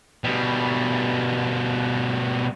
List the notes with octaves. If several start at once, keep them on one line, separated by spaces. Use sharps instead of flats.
B2 G3